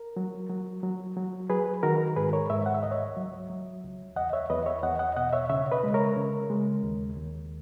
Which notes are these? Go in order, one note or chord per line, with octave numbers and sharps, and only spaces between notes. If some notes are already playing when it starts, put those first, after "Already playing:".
Already playing: A#4
F#3
F#3
F#3
F#3
F#3 G#4 B4
D#3 F#4 A#4
G#2 G#4 B4
A#4 C#5
G#2 C#5 E5
F#5
E5
C#2 D#5
C#5 E5
F#3
F#3
C#2
E2 D#5 F#5
C#5 E5
E2 B4 D#5
C#5 E5
E2 D#5 F#5
D#5 F#5
B2 D#5 F#5
C#5 E5
C#3 C#5 E5
B4 D#5
G#3
A#4 C#5
C#3
G#3
D#2
D#2